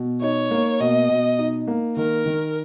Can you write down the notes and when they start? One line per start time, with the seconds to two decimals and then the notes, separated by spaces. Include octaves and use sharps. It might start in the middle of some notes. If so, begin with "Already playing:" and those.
Already playing: B2
0.22 D#4 C#5
0.51 A#3
0.80 B2 D#5
1.09 B2
1.39 D#4
1.67 A#3
1.96 D#3 A#4
2.26 D#3